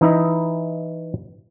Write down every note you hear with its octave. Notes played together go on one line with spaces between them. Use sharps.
E3 D#4 E4 D#5